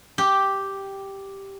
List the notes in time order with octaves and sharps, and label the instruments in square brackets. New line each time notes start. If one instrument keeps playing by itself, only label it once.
[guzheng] G4